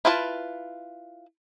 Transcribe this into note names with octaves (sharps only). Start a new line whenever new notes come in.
E4 F4 B4 D5 A5